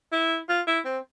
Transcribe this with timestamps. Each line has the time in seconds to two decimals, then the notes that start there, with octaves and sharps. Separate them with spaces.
0.12 E4
0.49 F4
0.67 E4
0.85 C4